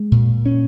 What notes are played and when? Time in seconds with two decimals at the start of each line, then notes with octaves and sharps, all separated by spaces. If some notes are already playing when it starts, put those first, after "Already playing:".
Already playing: G#3
0.12 A#2
0.46 C#4